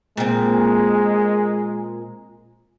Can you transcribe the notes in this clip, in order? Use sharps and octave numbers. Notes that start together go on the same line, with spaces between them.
A#2 G#3 C4